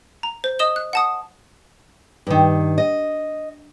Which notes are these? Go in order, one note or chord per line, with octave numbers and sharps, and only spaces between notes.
A#5
C5
D#5 D#6 E7 G7
F#6
F#5 A5 D#6
G2 D#3
D#5